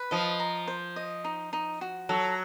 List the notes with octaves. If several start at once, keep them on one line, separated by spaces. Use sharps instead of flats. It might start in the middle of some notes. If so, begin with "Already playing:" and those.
Already playing: B4
F3 D#5
A#5
C5
D#5
D#4
D#4
F#4
F#3 A4